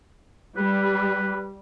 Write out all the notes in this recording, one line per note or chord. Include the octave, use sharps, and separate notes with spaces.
G3 B4